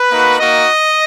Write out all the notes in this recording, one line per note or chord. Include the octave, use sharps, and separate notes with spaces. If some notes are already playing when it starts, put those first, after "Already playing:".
Already playing: B4
A#3 D#4 F#4
A#3 D#4 F#4 D#5